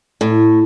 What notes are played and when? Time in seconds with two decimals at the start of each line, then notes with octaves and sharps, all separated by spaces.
0.21 A2